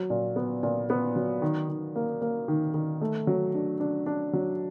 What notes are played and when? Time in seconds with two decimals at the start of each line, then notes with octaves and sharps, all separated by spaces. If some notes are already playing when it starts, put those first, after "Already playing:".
Already playing: F#3
0.10 A#2
0.36 B3
0.63 A#2
0.90 B3
1.16 F#3
1.42 D#3
1.69 D#3
1.96 A#3
2.21 A#3
2.48 D#3
2.74 D#3
3.01 A3
3.27 F#3
3.54 D4
3.80 D4
4.06 D4
4.33 F#3